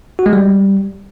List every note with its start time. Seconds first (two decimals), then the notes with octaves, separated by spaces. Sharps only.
0.19 F#4
0.26 G#3
0.33 G3